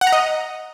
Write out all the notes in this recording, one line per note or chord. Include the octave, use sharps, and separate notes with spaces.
F#5
A#5
D#5